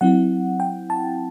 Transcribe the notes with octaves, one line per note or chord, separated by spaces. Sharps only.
F#3 C4 E4 F#5
G5
A5